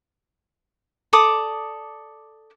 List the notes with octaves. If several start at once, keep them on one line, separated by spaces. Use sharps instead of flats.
A4 D5 D6 D#6